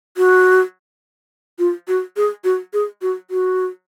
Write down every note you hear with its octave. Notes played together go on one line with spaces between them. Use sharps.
F#4
F4
F#4
G#4
F#4
G#4
F#4
F#4